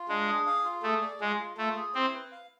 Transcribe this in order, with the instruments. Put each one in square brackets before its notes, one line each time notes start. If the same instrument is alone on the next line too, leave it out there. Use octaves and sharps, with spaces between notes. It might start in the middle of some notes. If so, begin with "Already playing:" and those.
Already playing: [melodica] F4
[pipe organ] G#3 [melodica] D4
[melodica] G#4
F5
F4
[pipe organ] A3 [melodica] G#4
[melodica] D5
[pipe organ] G#3 [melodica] F4
[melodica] F4
[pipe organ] A3 [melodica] F4
[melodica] G#4
[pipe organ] C4 [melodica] E4
[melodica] B4
F5